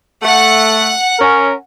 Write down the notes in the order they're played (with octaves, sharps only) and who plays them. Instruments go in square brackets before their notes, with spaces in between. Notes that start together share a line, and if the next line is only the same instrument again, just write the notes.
[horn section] A3 [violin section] F#5
[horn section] C#4 A#4